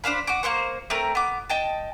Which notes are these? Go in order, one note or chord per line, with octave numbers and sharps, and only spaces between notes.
D4 C5 F5 B5
F#4 D6
A#3 C4 C5 C#6
A3 C4 A#4
B3 D6
D#5 G5 A5